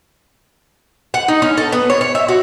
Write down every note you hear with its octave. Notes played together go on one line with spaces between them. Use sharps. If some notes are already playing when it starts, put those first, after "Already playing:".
F#5
D#4
C#4
A4
B3
C#5
C#5
E5
F#4